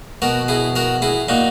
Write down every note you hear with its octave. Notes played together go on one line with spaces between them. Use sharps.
B2 F#4 A#4
E4 G#4
F#4 A#4
E4 G#4
A#2 D#4 F#4